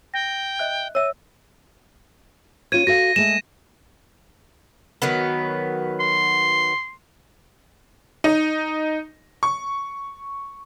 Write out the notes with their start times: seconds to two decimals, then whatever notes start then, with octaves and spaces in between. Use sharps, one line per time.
0.14 G5 A#6
0.59 D#5 E5 F#6
0.95 C#5 E5 E6 D#7
2.72 C#4 F4 C#5 G#6 D#7
2.87 F#4 A4 F5 A#6
3.16 G#3 A3 E7
5.02 D#3 F#3 B3
6.00 C6
8.24 D#4
9.43 C#6